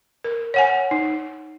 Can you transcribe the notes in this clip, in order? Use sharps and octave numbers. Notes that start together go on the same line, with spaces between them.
A#4
C#5 F#5 G#5
D#4